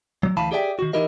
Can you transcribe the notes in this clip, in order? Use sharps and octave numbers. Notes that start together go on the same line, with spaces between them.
F#3
D2 E3 F5 A5 B5
G4 G#4 D5 E5 F#5 G5
D#3 F#4
E3 D#4 E4 G4 A#4 D#5